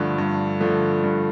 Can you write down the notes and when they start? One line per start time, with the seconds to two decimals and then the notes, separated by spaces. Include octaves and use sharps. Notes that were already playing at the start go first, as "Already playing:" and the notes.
Already playing: G2 D3 F3 A3
0.18 G2
0.60 D3 F3 A3
1.04 G2